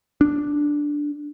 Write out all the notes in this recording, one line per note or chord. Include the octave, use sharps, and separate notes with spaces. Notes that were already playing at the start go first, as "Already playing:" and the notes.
D4